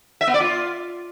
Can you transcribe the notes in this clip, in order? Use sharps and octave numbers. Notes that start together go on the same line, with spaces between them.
E5
B3
D5
F4